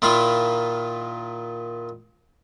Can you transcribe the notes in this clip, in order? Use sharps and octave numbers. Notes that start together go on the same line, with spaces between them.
A#2 D#3 E4 F4 F5